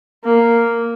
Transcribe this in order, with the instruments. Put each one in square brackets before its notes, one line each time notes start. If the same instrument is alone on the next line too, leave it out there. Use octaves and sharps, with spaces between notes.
[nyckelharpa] A#3